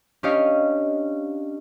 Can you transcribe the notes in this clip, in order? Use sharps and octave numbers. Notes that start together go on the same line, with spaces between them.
C#4 D4 G4 C#5 D#5 F5